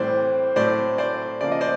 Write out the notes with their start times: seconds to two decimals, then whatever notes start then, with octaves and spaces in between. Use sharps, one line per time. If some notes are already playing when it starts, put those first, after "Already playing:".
Already playing: A2 E3 G3 C4 C5 D5
0.56 A2 F#3 A3 C4 C5 D5
0.98 C5 D5
1.41 C#3 F3 A#3 D5
1.52 D#5
1.61 C5 D5